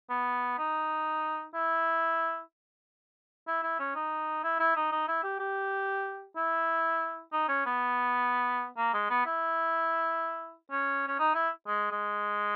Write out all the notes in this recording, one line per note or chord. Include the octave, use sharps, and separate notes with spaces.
B3
D#4
E4
E4
E4
C#4
D#4
E4
E4
D#4
D#4
E4
G4
G4
E4
D#4
C#4
B3
A#3
G#3
B3
E4
C#4
C#4
D#4
E4
G#3
G#3